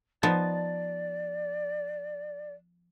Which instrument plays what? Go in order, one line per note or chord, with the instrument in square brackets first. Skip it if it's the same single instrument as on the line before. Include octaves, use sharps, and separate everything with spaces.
[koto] F3 B3 D#4 [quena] D5 [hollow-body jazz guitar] A5